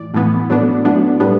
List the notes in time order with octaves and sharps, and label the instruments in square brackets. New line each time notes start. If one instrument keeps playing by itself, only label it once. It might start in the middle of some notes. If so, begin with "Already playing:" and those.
Already playing: [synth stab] A2 E3 D5
A2 E3 B3
A2 F#3 B3 D4
A2 F#3 B3 D4
A2 G3 B3 D4